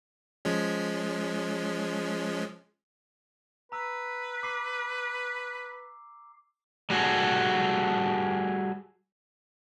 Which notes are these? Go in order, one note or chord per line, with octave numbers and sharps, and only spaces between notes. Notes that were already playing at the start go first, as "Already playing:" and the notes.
F3 G#3 C#4
B4 A#5 E6
D6 C7
G3 F#4 G#4 A4